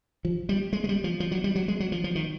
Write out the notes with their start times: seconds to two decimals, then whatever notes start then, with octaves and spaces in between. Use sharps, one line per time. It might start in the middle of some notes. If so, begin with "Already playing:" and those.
0.25 F3
0.49 G3
0.73 G#3
0.84 G#3
0.89 G3
1.04 F3
1.20 F3
1.32 F#3
1.44 G3
1.55 F#3
1.68 G#3
1.80 F#3
1.92 F3
2.04 F3
2.15 D#3